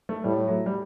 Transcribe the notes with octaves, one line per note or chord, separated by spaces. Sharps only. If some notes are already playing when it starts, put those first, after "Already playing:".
A3
A2 G3
F#3
G3